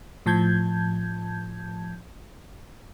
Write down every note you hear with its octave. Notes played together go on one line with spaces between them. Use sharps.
A2 F3 A5 G6 G#6